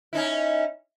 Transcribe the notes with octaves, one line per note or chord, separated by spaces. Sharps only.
C#4 D#4 E4